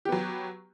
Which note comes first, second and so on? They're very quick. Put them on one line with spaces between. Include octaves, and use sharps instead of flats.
G4 B3 F#3